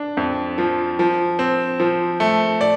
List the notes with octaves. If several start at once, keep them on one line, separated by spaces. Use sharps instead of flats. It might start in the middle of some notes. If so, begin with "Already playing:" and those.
Already playing: D4
F2
F3
F3
C4
F3
A3
D5